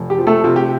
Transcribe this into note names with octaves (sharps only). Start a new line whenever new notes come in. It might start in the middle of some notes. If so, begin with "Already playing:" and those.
Already playing: F1
G4
F3
A3 A4
C3 F4
G4